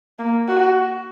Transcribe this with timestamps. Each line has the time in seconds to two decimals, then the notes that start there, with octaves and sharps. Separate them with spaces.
0.19 A#3
0.48 F#4